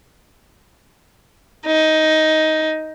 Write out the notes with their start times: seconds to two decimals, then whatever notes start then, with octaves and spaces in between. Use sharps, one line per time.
1.66 D#4